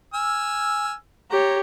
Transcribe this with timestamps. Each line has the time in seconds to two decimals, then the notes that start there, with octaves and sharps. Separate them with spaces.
0.14 G#5 E6 F6
1.31 G4 C#5 A#5